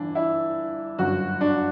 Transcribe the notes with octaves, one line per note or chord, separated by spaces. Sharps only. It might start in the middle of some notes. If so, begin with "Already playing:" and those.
Already playing: G1 E3 D4
E4
G1 F#2 D3 F#4
D4